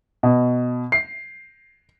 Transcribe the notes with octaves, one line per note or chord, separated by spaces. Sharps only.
B2
C7